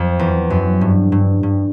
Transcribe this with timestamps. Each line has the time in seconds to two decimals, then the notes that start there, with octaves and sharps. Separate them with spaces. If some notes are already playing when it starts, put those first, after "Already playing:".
Already playing: F2
0.19 E2
0.50 F#2
0.81 G2
1.12 G2
1.43 G2